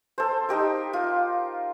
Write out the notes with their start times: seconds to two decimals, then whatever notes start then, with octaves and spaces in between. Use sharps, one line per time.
0.18 A4 C5
0.49 D#4 G4 A#4
0.93 F4